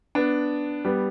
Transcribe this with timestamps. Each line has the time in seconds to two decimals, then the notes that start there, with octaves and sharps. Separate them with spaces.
0.15 B3 D4
0.85 G3 B3